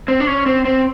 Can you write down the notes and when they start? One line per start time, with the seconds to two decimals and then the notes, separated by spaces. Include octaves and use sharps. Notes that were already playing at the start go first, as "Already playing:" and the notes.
0.08 C4
0.20 D4
0.27 C#4
0.46 C4
0.65 C4